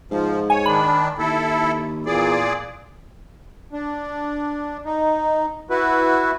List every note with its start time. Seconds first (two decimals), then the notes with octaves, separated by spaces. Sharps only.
0.11 G#2 F3
0.50 C#5 G#5
0.66 D#3 D4 B5
1.18 D#2 E4 A4
2.06 E2 A#2 G#4 D5
3.73 D4
4.85 D#4
5.70 E4 F#4 B4